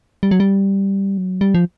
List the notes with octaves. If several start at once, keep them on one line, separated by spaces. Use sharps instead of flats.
G3
F#3
G3
F#3
G3
F3